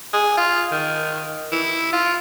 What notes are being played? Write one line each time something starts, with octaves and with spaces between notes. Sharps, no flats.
G#4
F4
D#3
E4
F4